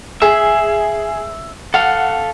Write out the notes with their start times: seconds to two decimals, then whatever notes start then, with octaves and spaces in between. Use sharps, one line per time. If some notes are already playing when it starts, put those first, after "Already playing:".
0.22 G#4 E5
1.74 A4 F5 F#5